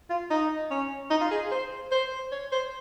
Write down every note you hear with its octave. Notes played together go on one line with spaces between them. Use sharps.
F4
D#4
C#4
D#4
F4
G#4
C5
C5
C#5
C5